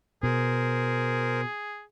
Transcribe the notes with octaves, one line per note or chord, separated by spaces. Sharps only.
B2 G#4 A#4 C5